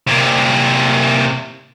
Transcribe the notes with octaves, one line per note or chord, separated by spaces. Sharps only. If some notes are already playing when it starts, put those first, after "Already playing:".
C3 A#3